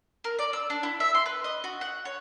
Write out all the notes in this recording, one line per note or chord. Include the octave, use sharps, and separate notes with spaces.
A#4
D5
E6
D4
E4
E5
C6
B4
D#5
F#4
F#5
C#5